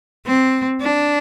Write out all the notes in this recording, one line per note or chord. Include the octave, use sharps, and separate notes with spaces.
C4
D4